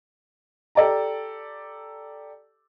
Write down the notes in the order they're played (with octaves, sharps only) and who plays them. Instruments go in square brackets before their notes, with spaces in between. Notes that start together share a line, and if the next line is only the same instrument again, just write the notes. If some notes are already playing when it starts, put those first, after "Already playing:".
[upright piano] G4 A4 D5 A5 A#5